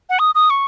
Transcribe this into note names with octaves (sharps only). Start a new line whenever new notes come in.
F#5
D#6
D#6
C#6